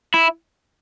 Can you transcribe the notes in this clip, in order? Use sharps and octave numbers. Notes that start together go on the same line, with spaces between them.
E4